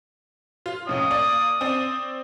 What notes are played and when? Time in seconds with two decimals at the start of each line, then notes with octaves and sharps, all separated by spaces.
0.66 F4
0.87 F2 A2 C#3 D#6
1.11 A#3 D5
1.61 C4 D5